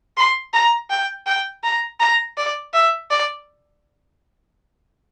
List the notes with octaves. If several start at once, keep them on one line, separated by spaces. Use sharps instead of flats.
C6
A#5
G5
G5
A#5
A#5
D5
E5
D5